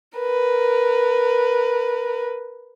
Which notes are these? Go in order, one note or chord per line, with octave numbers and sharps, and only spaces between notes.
A#4 B4